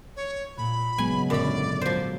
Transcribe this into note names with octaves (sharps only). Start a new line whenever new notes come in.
C#5
A#2 B5
G#1 C#3 F#3 G#3 B3 G#5
F#2 A#2 D3 D5 B5
F3 F#3 C5